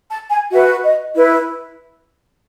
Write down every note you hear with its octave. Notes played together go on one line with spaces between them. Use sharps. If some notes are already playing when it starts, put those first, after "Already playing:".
A5
G#5
F#4 B4 E5
D#5
E4 B4